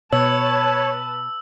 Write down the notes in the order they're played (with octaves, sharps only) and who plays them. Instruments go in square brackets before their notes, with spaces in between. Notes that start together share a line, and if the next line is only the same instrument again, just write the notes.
[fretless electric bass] B2 [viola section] B4 A5 [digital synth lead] C#5 [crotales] E6